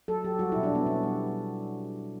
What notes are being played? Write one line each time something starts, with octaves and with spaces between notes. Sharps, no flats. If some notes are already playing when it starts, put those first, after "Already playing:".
F#3 A4
F#3 G4
G3 F#4
E4
B2
D4
B2 B3
B3 C#4
G3